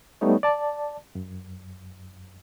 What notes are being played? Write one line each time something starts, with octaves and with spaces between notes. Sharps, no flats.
G3 A3 B3 D#4 C#5
D5 A5
F#2